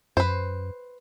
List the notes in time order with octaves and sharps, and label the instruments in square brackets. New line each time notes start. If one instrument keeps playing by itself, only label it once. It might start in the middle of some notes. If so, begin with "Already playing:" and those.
[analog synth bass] F#2 [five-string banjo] B4 C5